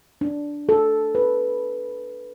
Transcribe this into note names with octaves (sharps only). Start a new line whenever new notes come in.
D4
A4
B4